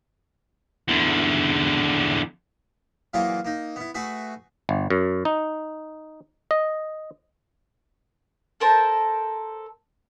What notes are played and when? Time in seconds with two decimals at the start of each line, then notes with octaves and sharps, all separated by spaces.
0.88 E2 D3
3.14 A#2 E3 F#3 A#3 F4 G#4
3.45 A#3 D#4
3.76 B3 E4
3.95 A3 F#4 G#4 B4
4.69 G1
4.90 F#2
5.25 D#4
6.51 D#5
8.60 A4 A#4 C5 A5